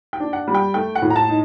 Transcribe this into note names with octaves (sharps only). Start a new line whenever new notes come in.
G5
D4
F#5
G3
G5
A3 G5
F#5
A2
A#5
A5
D#4